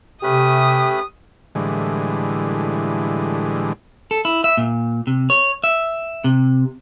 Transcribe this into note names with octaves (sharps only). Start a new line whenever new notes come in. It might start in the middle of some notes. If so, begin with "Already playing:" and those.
C3 A3 C#4 G4 B4 D#6
A2 D3 E3 G3 G#3
A4
E4
E5
A#2
C3
C#5
E5
C3